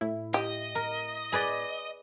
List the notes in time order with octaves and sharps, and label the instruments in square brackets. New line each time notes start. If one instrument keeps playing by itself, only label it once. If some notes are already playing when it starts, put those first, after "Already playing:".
[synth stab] A2 E4
[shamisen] G4 [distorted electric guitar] D#5
[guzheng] A#4
G#4 B4 D5